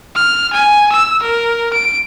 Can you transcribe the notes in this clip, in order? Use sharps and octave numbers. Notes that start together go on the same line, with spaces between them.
F6
G#5
E6
A#4
D7